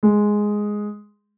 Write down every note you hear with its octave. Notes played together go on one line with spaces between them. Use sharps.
G#3